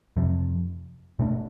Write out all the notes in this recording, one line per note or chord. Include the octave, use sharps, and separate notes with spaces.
F2 C3 F3
B2 A3 D4